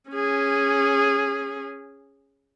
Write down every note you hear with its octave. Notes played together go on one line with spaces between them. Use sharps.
C#4 G#4